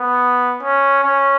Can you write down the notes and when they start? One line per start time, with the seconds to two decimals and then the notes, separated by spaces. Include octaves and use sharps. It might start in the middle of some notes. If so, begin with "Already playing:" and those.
Already playing: B3
0.63 C#4
1.04 C#4